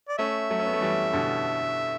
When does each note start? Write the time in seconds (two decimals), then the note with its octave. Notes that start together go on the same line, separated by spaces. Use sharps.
0.09 D5
0.18 A3 C#4 E5
0.50 F#3 A3
0.59 C#4
0.66 B3
0.73 A3
0.81 E3 G3
1.13 B2 D3